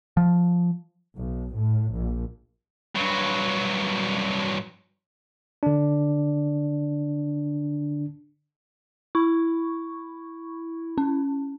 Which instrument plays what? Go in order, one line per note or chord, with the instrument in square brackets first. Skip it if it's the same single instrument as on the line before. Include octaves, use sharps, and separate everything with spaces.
[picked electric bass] F3
[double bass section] B1
A2
A#1
[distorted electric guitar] G2 F#3
[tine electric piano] D3 D4
[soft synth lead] E4 [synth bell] C#6
[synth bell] C#4